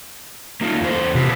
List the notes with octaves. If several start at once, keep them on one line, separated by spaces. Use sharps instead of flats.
A#3 D#4 F4
E2 C5
C3 F4 F#4 B4